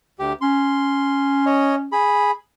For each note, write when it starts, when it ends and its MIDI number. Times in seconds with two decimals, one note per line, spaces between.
0.19 0.33 38
0.19 0.33 67
0.41 1.93 61
0.41 1.45 84
1.46 1.75 73
1.46 1.75 75
1.92 2.31 68
1.92 2.31 83